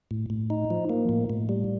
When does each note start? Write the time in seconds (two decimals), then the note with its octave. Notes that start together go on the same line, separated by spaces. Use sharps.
0.11 A2
0.30 A2
0.50 D#4
0.70 F3
0.89 A#3
1.09 A2
1.30 A2
1.49 G3